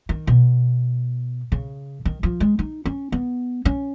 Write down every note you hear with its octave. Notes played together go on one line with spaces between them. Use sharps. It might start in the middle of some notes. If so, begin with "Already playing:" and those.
D#3
B2
C#3
D#3
F3
G#3
D#4
C#4
B3
C#4